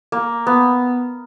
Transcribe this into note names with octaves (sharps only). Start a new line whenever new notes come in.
A#3
B3